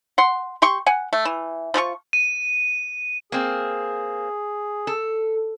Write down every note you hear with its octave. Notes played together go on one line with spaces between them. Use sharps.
F#5 C6
G4 G5 C6 C#6
F#5 G#5
A3
E3
F3 F4 A4 C#6
D#7
A#3 C4 G#4
A4